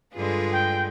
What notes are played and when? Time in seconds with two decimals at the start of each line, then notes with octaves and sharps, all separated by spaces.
0.14 G2 D3 G#3 F4 G#4 B4
0.52 G5